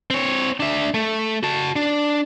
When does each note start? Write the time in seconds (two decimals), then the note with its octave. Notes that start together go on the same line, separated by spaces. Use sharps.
0.10 C4 C#5
0.60 D4 E5
0.94 A3
1.43 F#4 A5
1.76 D4